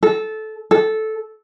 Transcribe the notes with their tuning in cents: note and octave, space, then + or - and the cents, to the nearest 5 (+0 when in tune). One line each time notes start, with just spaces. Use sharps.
A4 -15
A4 -10